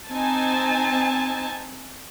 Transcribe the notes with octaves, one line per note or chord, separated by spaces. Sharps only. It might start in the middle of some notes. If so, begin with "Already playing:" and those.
C4 D#4 G#5 A5